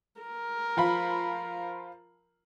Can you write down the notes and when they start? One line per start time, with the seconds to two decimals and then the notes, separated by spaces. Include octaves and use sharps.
0.21 A#4
0.77 F3 F4 B5